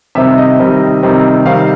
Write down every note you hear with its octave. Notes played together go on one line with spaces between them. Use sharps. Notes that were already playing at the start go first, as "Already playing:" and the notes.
C3 D#3 G3 C4 E5
D#5
C3 D#3 G3 C4
C3 D#3 G3 C4
C3 D#3 G3 C4 F5